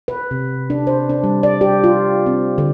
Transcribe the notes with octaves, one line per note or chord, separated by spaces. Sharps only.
B4
C3
D4
C5
D4
G3
D5
G4
F4
C4
D3